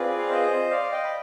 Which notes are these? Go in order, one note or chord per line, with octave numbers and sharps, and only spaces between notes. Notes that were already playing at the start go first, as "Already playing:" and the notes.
Already playing: C4 F4 G#4 B4 D5
F5
C5 D#5
D5 F5
D#5 G5
B5